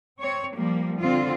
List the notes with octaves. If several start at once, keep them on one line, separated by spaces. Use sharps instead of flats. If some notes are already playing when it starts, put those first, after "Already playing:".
C4 C#5
F3 G3 A#3
D3 C4 F4